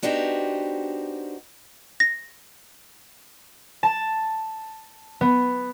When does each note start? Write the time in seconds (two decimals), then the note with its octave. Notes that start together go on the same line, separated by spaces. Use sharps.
0.02 B3 D4 D#4 F#4 G4 C5
2.00 A#6
3.83 A5
5.21 B3